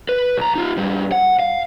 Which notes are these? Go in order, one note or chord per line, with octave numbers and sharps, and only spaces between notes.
B4
B1 A#5
D#4 F4
G#2 G3
F#5
F5